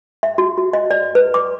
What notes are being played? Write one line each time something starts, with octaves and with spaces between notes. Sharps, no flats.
E5
F#4
F#4
D#5
D5
B4
D6